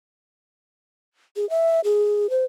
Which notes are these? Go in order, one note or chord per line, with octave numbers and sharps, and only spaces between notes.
G#4
E5
G#4
C5